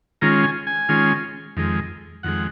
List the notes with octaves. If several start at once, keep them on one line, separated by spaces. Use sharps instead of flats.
D#3 G#3 C#4 F4 A#5
G#5
G#5
D#3 G#3 C#4 F4
F2 D#3 G#3
F2 D#3 G#3 F#5